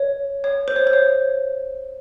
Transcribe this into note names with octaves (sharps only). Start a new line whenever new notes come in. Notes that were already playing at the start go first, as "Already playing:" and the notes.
Already playing: C#5
C#5
C5
C#5
C5
C#5